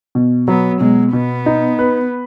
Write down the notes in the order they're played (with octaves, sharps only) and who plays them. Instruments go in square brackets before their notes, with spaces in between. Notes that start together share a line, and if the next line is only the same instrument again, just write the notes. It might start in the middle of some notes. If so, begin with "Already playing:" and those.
[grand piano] B2
[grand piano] F#3 [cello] B3
[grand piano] B2 [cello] G#3
[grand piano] B2 [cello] B3
[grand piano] D#4
B4